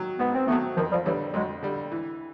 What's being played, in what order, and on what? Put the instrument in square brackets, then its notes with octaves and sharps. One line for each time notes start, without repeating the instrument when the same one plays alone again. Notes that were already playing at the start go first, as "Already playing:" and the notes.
Already playing: [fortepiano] D#3 F#3
[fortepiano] G#2 [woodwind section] B3
[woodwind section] C4
[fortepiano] D#3 F#3 [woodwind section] A3 B3
[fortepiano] F2 [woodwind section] D#3 F3
[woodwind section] F3 G3
[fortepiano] D3 G3 [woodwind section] E3 F#3
[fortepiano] F2 [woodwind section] F#3 G#3
[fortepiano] D3 G3
E3